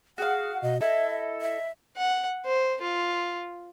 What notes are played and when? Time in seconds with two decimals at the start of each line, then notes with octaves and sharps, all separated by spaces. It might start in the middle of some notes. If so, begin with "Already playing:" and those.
0.18 F#4 G#4 F5 F#5
0.62 B2 D#5
0.81 E4 A4 D#5 E5
1.41 E5
1.97 F#5
2.45 C5
2.82 F4